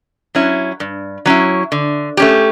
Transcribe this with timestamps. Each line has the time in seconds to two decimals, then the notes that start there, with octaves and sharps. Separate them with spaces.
0.35 F#3 C#4 E4
0.80 G2
1.26 F#3 C#4 E4
1.72 D3
2.17 A3 C#4 G4